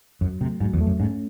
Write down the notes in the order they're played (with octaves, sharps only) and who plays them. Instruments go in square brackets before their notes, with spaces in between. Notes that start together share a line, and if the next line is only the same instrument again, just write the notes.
[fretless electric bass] F#2 [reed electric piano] F#3
[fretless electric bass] C3 [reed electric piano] A3
[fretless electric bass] G#2 [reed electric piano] F#3
[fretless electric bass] E2
[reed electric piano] A3
[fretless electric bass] F#2
[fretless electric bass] G#2 [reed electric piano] C#4